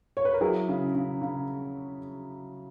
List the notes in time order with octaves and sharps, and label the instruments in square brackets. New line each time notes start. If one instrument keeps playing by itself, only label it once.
[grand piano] C#5
B4
A#4
F#3 E4 G#4
C#3
C#3
C#3